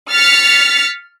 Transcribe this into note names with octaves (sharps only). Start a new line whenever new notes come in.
F6 A6 B6 C#7